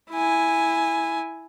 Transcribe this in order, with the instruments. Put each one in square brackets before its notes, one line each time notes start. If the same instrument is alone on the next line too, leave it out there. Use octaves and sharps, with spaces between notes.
[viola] E4 G#5